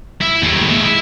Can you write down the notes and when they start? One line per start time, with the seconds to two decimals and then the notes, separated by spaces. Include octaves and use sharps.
0.21 E4
0.42 D#2 A2
0.70 G#3 E5
0.84 E4